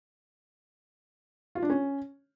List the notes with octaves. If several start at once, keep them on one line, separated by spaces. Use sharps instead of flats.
F4
D4
C#4